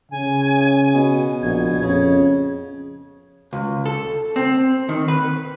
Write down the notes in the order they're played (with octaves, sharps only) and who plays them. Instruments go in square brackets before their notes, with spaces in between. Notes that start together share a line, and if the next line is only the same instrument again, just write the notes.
[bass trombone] C#3 [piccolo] G#5
[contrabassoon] B2
[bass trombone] A#1 [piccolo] G#6
[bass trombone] F2 [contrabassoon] C#3
[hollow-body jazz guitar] C#2
A4
C4
D#3
B4